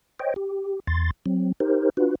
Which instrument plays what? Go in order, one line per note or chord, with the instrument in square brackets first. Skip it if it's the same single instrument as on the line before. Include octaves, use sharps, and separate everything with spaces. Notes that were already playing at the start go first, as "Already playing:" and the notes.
[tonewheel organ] C5 C#5 D#5 G5
G4
E2 C6 A6
F#3 C4
D#4 G4 A#4 C5
D4 F4 F#4 B4